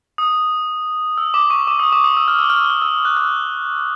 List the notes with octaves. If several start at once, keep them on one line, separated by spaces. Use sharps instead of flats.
D#6
E6
D6
C#6
D6
D#6
D6
D#6
E6
F6
E6
F6
E6
F6
E6
F#6
F6